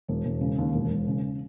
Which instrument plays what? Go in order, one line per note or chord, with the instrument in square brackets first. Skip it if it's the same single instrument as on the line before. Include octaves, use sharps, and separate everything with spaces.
[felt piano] E1
E1
C#3
D#2
E1
E1
C#3